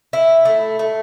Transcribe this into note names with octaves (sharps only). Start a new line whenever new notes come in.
E4
A3
A3